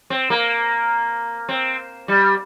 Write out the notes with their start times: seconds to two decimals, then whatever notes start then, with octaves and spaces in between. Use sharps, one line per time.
0.10 C4
0.30 A#3
1.49 C4
2.08 G3